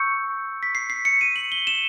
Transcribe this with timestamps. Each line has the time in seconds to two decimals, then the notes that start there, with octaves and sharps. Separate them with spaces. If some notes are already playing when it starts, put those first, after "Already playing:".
Already playing: C#6 E6 G6 C#7
0.63 B6
0.75 C7
0.90 C7
1.05 C#7
1.21 D#7
1.36 F#7
1.52 G7
1.67 E7